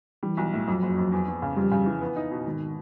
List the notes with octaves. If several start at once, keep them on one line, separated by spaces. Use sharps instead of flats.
E3 G3
B1
A2
F2 F#3
F#1
F2
E2
E2
C#3
F2 G3
C#3
E3
B3
D#4
B2
G#1 D#3